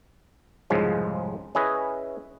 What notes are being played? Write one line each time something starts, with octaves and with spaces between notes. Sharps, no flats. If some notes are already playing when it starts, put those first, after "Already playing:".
C2 F2 G#2 C#3 F3 G#3
C#4 E4 G#4 B4 D#5